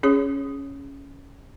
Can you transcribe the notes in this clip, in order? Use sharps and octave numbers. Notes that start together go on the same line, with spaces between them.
C#4 G#4 C#5 D#6